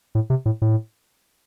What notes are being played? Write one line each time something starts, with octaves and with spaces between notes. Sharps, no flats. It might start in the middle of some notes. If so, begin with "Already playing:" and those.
A2
C3
A2
A2